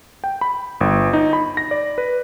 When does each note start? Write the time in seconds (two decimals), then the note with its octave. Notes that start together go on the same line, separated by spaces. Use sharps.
0.24 G5
0.41 B5
0.81 G1
1.13 D#4
1.33 B5
1.57 A#6
1.71 D5
1.98 B4